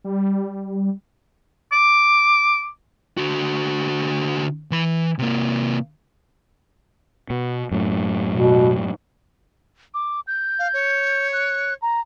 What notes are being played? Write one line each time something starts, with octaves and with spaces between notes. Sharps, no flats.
G3
D6
D3 F#4
E3 B5
C3 A#3
B2
F#2 A2
B2
D6
G6
F5
C#5
F#6
A#5